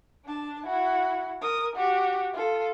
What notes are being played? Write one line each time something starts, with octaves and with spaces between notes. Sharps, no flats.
D4 A5
E4 F#4
A#4 D#6
F#4 G4
F4 A4